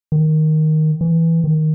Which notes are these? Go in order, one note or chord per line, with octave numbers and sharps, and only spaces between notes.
D#3
E3
D#3